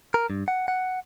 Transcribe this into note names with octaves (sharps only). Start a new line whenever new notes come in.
A#4
G2
F#5
F#5